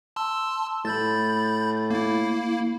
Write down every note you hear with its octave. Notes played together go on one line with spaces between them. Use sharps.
A5 C6 E6
A2 B5 G6 A6
A#3 E4